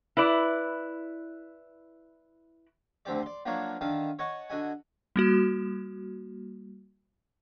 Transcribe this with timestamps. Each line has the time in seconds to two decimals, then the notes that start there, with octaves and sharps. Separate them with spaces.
0.17 E4 B4 D5
3.05 D2 D3 C4 G4 D5
3.23 D5 C6
3.46 F3 F#3 A#3 D4 A#4 C#5
3.81 D3 D#3 F5 A5
4.19 C#5 D#5 F#5 A5 C#6
4.50 D3 F#4 D#5 G#5
5.16 G3 A#3 F#4